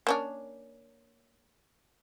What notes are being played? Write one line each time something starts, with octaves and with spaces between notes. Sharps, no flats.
A#3 C#4 D4